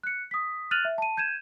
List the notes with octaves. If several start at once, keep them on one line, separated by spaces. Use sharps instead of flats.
F#6 C#7
D#6 B6
F6 F#6 A6 D#7 F7 F#7
E5
A5 D#7
G6 G#6 D#7 E7